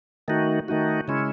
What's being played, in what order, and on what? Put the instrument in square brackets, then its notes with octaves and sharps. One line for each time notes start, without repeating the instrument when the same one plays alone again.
[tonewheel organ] D#3 A3 D#4 F#4
D#3 A3 D#4 F#4
C#3 G#3 C#4 E4